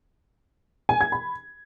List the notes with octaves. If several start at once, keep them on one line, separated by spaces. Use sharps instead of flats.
G#5
G#6
B5